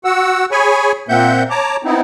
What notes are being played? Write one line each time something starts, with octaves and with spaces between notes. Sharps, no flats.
F#4 F#5 E6
G#4 C#5 G#5 B5 C#6
A#2 A#3 C4 E5 F#5 G6
C#5 A5 A#5 D6
B3 C4 D#4 E4